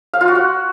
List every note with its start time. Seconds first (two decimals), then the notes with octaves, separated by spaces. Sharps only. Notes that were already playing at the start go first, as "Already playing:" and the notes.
0.13 F5
0.21 F4
0.28 F#4
0.35 F#5